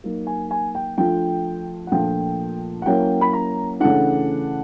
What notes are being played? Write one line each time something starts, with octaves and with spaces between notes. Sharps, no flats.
F#3 A#3 D#4
G#5
G#5
G5
F3 A3 D4 F4 G5
F#5
A#2 F3 A3 D4 F4 G5
F#5
F#3 A#3 C#4 E4 G5
B5
A#5
C#3 E3 A3 D4 F#5